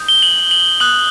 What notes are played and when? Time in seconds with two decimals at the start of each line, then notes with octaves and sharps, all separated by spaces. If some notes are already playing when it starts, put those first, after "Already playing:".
Already playing: D#6 G6
0.08 G7
0.23 F#7
0.51 F#7
0.80 D#6 F#6 F#7